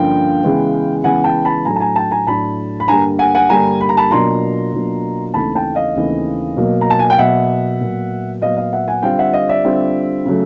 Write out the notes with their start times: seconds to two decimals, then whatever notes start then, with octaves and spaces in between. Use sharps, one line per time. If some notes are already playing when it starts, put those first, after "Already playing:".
Already playing: G2 D3 F3 A#3 C#4 F5 G5
0.43 C#3 E3 G#3 B3
1.04 C#3 E3 G#3 B3 F#5 G#5
1.24 G5 A5
1.45 A5 B5
1.65 A2 F#3 A3 D4 G#5 A#5
1.76 A5
1.80 G#5 A#5
1.96 G5 A5
2.12 G#5 A#5
2.27 A2 F#3 A3 D4 A5 B5
2.80 B5
2.88 G2 D3 G3 A#3 G#5 A#5
3.19 F#5 G#5
3.35 F#5 G#5
3.49 G2 D3 G3 A#3 G#5 A#5
3.81 B5
3.89 A#5
3.97 A5 B5
4.11 B2 F#3 A#3 D4 F4 A#5 C6
4.73 B2 F#3 A#3 D4 F4
5.34 D#2 C#3 E3 A3 C4 A5 B5
5.55 G5 A5
5.75 D#5 F5
5.95 D#2 C#3 E3 A3 C4
6.57 B2 F#3 A#3
6.81 A#5
6.90 A5
6.99 G#5
7.10 G5
7.18 B2 F#3 A#3 E5 F#5
7.81 A#2 F#3 B3
8.42 A#2 F#3 B3 D#5 F5
8.57 D#5 F5
8.73 E5 F#5
8.88 F#5 G#5
9.03 D3 G3 C4 F4 F5 G5
9.19 E5 F#5
9.33 D#5 F5
9.49 D5 E5
9.65 D3 G3 C4 F4
10.25 C#3 F#3 A3